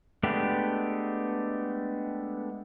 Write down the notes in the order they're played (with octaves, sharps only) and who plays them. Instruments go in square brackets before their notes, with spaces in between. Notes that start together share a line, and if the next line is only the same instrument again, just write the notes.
[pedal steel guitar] G#3 A3 B3 D4 G4